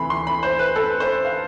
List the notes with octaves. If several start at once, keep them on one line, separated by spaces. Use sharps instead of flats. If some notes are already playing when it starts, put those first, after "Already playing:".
Already playing: D2 C3 E3 B5 C6
C6
B5
C5
B4
A4
C5
F5